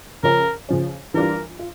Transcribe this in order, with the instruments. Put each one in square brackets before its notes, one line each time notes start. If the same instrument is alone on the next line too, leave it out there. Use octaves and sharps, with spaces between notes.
[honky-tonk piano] C#3 F3 C#4 [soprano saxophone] A#4
[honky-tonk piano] C#3 F3 C#4
[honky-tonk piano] E3 G3 D4 F4 [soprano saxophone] A#4
[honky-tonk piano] F4